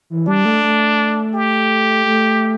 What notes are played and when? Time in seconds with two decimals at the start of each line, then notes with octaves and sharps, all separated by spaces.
0.10 E3
0.27 G3 D4
0.45 A3
0.63 A3
1.34 G4
2.06 A3